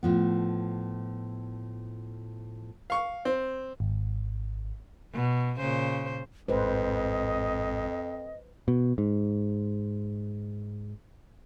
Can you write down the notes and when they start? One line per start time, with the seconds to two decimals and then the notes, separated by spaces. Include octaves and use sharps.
0.03 A2 F3 B3
2.90 F5 C#6
3.25 C4
3.80 G#1
5.14 B2
5.58 A#2 C#3 C5
6.48 A1 F2 G#2 B4 C5 D#5
8.68 B2
8.98 G#2